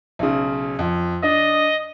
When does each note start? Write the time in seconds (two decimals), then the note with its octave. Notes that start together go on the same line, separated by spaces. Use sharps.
0.19 B1 C#3
0.79 F2
1.23 D4 D#5